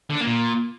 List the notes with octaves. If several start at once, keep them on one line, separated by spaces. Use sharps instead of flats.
D3
D4
A#3
A#2